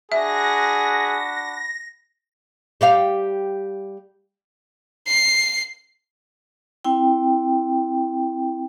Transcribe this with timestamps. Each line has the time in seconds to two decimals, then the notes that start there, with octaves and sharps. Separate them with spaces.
0.12 D4 F#4 G#4 E5 B5 A#6
2.81 G3 G4 F5
5.07 C7
6.84 C4 E4 G5